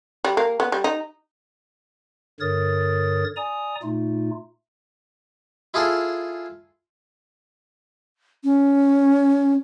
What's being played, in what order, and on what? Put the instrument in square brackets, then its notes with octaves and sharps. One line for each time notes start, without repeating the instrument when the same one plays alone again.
[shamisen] G3
A#3
B3
G3
D#4
[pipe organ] G2 D3 A#4 C#5 D#6 A6
D5 G#5 A#5 D#6
A#2 A3 D#4 F4
[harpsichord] E4 F4 G#4 A4
[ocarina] C#4